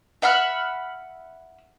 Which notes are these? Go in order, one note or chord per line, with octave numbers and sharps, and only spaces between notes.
E5 F#5 B5 F6